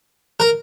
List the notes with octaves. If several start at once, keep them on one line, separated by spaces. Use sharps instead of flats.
A#4